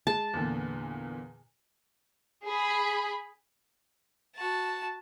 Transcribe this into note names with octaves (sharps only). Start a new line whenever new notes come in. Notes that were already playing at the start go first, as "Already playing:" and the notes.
G#3 G#4 A5
E2 A#2 D3
G#4 B5
F#4 A5